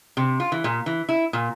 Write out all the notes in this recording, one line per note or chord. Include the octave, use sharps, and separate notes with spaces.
C3
F4
E3
A#2
E3
E4
A#2